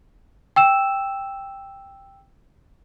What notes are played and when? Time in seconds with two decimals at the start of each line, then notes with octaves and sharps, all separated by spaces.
0.56 G5 E6 E7